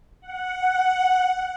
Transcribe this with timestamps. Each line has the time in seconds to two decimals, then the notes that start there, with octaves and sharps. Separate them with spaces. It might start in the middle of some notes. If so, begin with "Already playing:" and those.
0.21 F#5